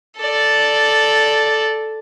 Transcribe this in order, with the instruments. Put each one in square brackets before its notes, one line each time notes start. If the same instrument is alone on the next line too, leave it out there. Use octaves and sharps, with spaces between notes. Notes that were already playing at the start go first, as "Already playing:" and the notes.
[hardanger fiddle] A4 D5